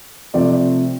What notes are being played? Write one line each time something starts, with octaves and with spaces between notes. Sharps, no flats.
C3 F3 A3 C4 D5